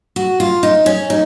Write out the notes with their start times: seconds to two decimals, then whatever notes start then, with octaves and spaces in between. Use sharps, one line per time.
0.16 F#4
0.40 F4
0.63 D#4
0.86 C#4
1.10 D#4